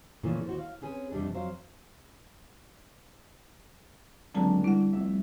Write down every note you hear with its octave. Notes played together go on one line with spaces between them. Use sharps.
A#2 C#3 E3 F3 A3 A#3
D#2 F#4 C5
F5
C4 C#4 G#4 B4
F2 C3 G3 D4
F2 F#3 C5 F5
C#2 D3 F#3 C4 A5 A#5
G3 E4 F#5
F1 E5